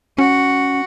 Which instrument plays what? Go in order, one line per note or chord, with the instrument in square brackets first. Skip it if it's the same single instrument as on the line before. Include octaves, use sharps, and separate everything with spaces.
[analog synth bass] C#4 [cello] F#4